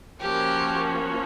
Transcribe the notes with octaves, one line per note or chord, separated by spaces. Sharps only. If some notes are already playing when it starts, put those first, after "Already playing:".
F3 A#3 C#4 F#4 G4